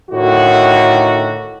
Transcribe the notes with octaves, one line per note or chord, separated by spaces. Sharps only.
A2 D3 D#3 F#4